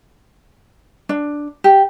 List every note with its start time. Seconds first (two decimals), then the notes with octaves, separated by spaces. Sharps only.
1.09 D4
1.64 G4